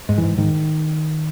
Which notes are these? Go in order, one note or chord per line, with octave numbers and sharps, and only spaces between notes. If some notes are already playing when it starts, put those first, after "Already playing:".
G#2
E3
G#2
G#2 D#3